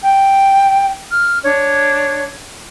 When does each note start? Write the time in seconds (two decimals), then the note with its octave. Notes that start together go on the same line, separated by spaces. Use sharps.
0.02 G5
1.11 F6
1.44 D4 C#5